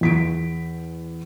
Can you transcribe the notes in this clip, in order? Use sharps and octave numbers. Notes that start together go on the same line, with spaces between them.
E2 B6 D7